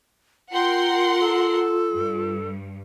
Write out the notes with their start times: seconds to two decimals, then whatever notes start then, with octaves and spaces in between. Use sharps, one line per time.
0.52 F4 A#4 F#5 G5 C6
1.20 A4
1.93 G2